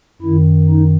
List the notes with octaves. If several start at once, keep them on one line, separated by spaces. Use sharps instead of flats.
F#2 D#3 E4
D#4